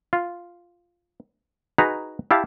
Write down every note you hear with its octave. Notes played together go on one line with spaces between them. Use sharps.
F4
D#4 F#4 G#4 B4 A#5
E4 G4 F5 A5